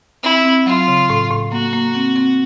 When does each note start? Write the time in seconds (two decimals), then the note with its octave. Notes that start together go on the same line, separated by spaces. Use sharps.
0.23 C4 E4
0.45 C4
0.66 F#3 F4
0.88 C#3
1.10 A2
1.30 A2
1.52 A#3 F#4
1.73 A#3
1.95 C4
2.16 C4